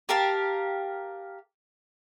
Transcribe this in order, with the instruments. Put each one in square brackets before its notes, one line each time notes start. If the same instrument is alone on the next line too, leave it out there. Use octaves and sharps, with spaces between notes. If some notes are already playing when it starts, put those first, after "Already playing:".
[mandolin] G4 A#4 F5 A5